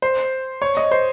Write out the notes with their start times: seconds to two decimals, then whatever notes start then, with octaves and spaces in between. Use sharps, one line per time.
0.02 C5
0.62 C#5
0.77 D#5
0.91 C5